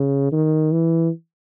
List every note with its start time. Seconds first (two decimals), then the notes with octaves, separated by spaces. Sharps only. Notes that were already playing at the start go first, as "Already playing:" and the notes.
Already playing: C#3
0.32 D#3
0.73 E3